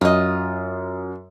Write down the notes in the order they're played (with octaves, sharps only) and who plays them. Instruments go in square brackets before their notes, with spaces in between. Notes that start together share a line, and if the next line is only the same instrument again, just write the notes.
[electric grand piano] F#2 [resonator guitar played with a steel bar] F4 D#5